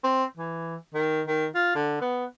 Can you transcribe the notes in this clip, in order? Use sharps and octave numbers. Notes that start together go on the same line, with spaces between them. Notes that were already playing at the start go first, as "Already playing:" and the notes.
C4
E3
D#3
D#3
F4
D3
B3